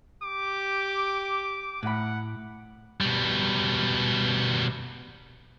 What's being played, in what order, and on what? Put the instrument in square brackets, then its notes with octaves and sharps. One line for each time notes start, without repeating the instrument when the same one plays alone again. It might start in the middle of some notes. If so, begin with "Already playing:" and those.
[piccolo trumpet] G4 [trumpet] D6
[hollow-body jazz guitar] A2 B5 [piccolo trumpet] F#5
[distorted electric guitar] B2 G3